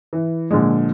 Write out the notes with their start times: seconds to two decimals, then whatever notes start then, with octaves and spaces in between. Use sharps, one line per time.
0.13 E3
0.51 A#2 D3 F3 G#3